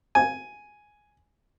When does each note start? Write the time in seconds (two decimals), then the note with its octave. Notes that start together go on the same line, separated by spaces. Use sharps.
0.15 G#5